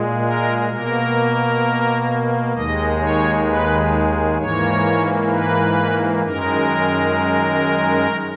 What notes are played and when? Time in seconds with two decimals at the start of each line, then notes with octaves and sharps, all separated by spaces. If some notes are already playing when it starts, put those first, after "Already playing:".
Already playing: A#2 G#3
0.22 A#4
0.68 B2 A#3 A#4
2.53 D#2 D#3 G#3 D#5
2.99 C#5
3.46 B4
4.38 G#2 E3 A#3 C#5
5.30 B4
6.23 F#2 D#3 G#3 A#4